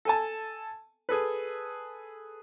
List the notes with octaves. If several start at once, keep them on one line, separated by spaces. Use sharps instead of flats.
A4 G#5 A5
G#4 A4 B4